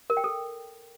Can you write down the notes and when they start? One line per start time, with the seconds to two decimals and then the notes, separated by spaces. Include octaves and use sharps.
0.10 A#4
0.17 G5
0.24 A4